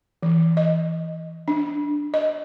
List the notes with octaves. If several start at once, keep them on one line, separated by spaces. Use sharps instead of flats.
E3
D#5
D4
D#5